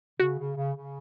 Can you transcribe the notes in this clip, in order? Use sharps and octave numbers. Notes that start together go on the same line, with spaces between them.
C#3 F#4
C#3
C#3
C#3